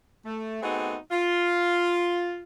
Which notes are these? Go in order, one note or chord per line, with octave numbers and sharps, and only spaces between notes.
A3
A3 B3 C4 D#4 F#4 G#4
F4